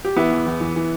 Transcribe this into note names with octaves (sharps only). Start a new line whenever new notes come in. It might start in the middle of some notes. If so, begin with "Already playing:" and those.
G4
E3 B3 E4
E2
E2
E3
E3